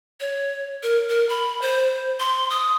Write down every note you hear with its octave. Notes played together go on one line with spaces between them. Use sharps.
C#5
A#4
A#4
B5
C5
C6
D#6